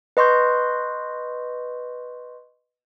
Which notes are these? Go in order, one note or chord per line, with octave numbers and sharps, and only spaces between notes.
B4 D#5 C6 C#6 G6